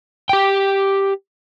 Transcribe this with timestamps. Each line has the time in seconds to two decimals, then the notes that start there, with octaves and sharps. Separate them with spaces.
0.29 G4 G5